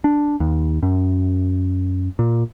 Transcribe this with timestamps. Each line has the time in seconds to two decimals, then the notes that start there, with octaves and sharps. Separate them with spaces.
0.04 D4
0.40 D#2
0.83 F#2
2.19 A#2